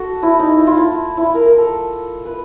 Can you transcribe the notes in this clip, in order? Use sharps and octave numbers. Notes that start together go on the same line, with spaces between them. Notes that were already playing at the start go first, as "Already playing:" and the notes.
Already playing: F#4 A4
E4
D#4
E4
F4
E4
E4
F4
A#4
A#4
A4
B4